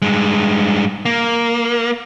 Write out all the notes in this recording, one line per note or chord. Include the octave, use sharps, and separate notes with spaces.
G2 G#3
A#3